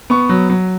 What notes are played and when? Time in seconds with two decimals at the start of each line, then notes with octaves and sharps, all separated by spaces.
0.10 B3 C#6
0.29 F#3
0.50 F#3